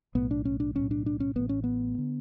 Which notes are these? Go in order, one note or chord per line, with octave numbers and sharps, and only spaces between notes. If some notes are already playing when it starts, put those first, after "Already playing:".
B1 A2 B3
D4
C#4
D4
B1 A2 C#4
D4
D4
C#4
A1 A2 B3
C#4
B3
D3